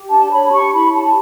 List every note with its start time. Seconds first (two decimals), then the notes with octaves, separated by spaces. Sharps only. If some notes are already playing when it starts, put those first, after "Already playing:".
Already playing: G4
0.09 D4 A5
0.31 C#5 B5
0.52 G4 C#6
0.73 E4 B5
0.93 G4 A5